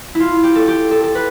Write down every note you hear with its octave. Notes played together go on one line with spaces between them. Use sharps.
E4 F4
G4
A4
G4
A4
A4
B4